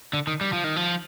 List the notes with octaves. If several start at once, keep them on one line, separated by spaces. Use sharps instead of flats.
D3
D#3
G3
F3
D#3
F3